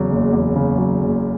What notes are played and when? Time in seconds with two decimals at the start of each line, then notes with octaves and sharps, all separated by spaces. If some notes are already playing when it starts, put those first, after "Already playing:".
Already playing: E2 C#3 F#3
0.11 F#1
0.33 E2
0.56 C#3
0.78 F#3
1.01 F#1